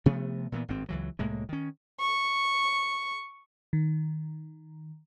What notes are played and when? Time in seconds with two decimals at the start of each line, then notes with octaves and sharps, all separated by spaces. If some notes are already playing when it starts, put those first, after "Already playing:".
0.06 C3 F3 A3 B3
0.52 A#2 E3 B3
0.68 G#1 G2 C4
0.89 C#2 E3 F#3
1.19 C2 A2 G#3 A#3
1.49 D#3 C#4
2.00 C#6
3.73 D#3